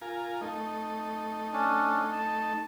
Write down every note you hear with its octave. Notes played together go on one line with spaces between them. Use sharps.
F4 A#4 G#5
A3 D#4
C#4 D4
A5